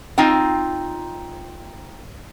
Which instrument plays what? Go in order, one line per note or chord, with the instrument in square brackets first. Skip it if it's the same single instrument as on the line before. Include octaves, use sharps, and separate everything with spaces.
[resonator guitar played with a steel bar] C4 D#4 F4 G5